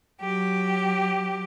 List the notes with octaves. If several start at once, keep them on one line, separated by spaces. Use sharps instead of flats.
F#3 G4